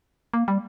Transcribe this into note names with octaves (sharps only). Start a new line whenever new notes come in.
A#3
G3